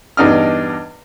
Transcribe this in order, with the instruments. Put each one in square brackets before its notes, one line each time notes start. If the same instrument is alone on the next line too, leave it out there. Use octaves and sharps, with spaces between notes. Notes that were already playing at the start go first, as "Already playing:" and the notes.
[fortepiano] E2 G2 D4 D#4 D#5 F6